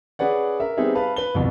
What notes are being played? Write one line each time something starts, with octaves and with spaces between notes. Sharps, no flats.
C#4 G#4 B4 D5 F#5
A#4 E5
G3 B3 C4 D#4 G#4 E5
B4 F5 A5 B5
B4 G7
C2 F2 B2